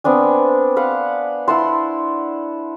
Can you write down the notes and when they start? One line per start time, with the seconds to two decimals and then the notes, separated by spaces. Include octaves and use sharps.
0.04 B3 C4 D4 G#5
0.76 B4 F5 F#5
1.48 E4 F#5 A5 C6